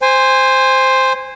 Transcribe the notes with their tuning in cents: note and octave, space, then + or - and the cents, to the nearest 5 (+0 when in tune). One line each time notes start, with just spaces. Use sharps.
C5 +0 G#5 -25